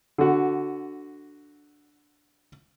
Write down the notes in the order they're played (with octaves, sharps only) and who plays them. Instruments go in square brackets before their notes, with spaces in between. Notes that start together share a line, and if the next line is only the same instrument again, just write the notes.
[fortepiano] D3 F#4